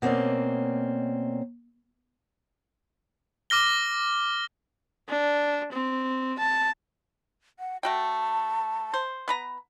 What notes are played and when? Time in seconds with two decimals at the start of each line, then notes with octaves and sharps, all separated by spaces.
0.02 B2 A#3 C4 C#4 D5 D#5
3.50 D6 F6 A#6 G7
5.09 D4
5.73 C4
6.39 A5
7.59 F#5
7.83 A3 F#4 G5 A5
8.94 C5
9.28 B3 B4 A#5